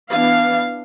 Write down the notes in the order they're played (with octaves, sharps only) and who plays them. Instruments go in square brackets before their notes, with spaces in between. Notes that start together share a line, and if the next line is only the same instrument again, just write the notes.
[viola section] E3 B3 D4 F5